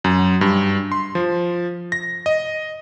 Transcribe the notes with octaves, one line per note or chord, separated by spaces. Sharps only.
F#2
G2
C6
F3
A#6
D#5